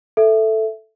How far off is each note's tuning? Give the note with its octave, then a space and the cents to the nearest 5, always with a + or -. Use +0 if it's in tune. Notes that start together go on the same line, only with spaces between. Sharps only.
A4 +0 E5 +0